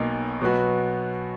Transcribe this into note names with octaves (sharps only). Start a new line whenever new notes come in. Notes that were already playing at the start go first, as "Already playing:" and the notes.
Already playing: B1 B2 A#3 D#4
B2 F#3 B3 F#4